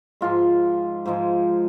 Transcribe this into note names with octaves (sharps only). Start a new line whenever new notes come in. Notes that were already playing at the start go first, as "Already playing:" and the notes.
G#2 F3 G#3 F4
G#2 F3 G#3